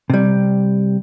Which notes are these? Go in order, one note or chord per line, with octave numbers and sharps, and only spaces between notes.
C3 G3